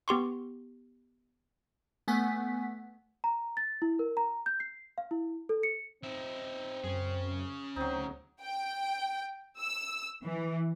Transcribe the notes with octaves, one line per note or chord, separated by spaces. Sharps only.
B3 G4 C6 C#6
A3 B3 F#5 G#5 B6
A#5
A6
E4
A#4
A#5
G6
C7
F5
E4
A4
C#7
C4 D#4 E5
F#2 C#4 G#4
D2 F#3 C4 D#4
G5
E6
E3